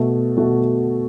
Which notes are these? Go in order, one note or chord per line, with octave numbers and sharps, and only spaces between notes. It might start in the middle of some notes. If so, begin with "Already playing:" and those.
Already playing: B2 A3 F#4
B2 A3 F#4